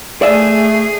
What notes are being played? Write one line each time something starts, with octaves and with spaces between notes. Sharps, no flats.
A3 G#4 D5 E5 G#5